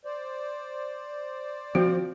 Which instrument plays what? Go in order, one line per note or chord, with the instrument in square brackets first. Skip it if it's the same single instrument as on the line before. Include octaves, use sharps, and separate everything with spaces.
[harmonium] C5 D5
[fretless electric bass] F3 C4 [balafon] F#4